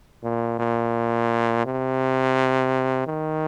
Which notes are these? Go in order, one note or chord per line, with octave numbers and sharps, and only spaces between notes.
A#2
A#2
C3
D#3